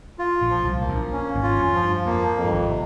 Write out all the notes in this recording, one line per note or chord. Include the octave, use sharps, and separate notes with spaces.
F4
A#1 A#2
F3
C2 C3
A#3
A#1 A#2
C#4
G#1 G#2
F4
F2
F3
G2
F2 A#3
F2
G2
G#1 G#2
C3